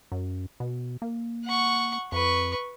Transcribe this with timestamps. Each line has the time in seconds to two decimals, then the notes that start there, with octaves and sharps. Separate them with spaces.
0.12 F#2
0.60 B2
1.02 A#3
1.45 F#5 C#6
2.12 F2 B4 C#6